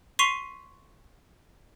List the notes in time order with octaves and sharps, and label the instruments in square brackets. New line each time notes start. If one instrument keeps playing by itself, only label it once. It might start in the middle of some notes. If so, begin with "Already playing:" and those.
[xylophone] C6 C#6 B6 C7 D#7 F7